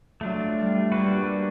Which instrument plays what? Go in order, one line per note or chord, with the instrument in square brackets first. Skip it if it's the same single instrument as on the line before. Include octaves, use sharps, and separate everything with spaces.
[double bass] F#3 [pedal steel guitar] A3 D4 F4
[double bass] G3
[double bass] G3 [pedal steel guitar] A#3 D4 F#4 B4